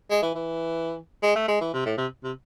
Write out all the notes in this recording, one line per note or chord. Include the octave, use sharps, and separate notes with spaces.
G#3
E3
E3
G#3
A3
G#3
E3
C3
A2
C3
C3